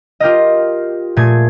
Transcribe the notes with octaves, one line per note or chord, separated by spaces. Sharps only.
F4 G4 A#4 D#5
A#2 A3 G#4 G#6